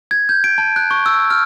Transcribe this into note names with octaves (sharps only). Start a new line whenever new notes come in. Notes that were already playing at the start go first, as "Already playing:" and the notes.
G#6
G6
D7
A5
F#6
C#6
E6
F6